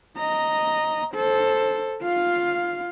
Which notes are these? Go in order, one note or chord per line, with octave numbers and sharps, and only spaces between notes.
D#5 A#5
A4 C5
F4 F5